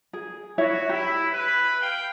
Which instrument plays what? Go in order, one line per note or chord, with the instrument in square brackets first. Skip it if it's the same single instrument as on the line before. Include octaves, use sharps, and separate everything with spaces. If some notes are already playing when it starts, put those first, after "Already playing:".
[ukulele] G#4
[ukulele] E4 C#5 E5 [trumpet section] F#4
[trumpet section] E4 [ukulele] G4
[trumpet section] B4
F5 G5